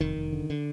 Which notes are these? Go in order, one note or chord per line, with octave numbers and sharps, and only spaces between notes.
F1 D#3
F1
D3
D3